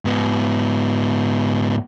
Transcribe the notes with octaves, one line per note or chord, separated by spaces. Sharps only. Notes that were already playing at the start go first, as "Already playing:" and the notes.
G#2 B3